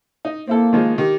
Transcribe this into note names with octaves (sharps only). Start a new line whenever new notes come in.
D#4
A#3 C4 E4 A4
D#3 F3 G#3
D#3 G4